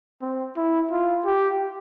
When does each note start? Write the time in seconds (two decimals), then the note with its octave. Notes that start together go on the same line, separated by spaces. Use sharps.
0.21 C4
0.57 E4
0.91 F4
1.25 G4